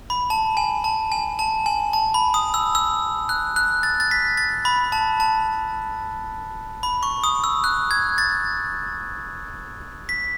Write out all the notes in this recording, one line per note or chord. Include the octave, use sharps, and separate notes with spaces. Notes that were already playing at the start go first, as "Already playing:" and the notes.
B5
A5
G#5
A5
G#5
A5
G#5
A5
B5
D#6
E6
E6
F#6
F#6
A6
A6
B6
A6
B5
A5
A5
B5
C#6
D#6
E6
F#6
G#6
A6
B6